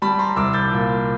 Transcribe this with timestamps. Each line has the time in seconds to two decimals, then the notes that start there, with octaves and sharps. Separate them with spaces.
0.02 G3 A5 B5
0.19 A#5 C6
0.36 C2 D6 E6
0.53 G6 A6
0.72 A#2